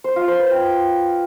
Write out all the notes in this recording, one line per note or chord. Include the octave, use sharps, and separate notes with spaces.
C5
F4
C5
B4
G5